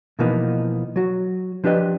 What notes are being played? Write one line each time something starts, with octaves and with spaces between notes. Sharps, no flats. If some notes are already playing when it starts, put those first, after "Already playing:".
B2 E3 F3 A#3 B3 D#4
F#3 F#4
F3 D4 G4 B4 D#5